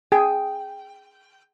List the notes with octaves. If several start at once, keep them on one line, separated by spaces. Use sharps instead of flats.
G#4 G5